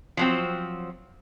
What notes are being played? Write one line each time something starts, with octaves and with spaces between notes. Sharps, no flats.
F3 F#3 C4